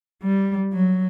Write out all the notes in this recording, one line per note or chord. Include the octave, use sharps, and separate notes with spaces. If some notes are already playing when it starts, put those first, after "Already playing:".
G3
F#3